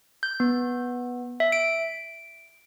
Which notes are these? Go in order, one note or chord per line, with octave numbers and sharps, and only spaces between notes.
G6
B3
E5
D7